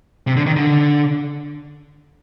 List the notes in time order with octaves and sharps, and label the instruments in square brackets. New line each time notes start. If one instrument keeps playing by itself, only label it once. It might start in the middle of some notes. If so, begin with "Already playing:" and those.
[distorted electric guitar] C3
D3
D#3
D3